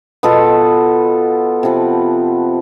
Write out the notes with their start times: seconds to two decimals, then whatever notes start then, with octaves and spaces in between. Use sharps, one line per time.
0.23 B2 B3 F4 A4
1.63 C3 F3 B3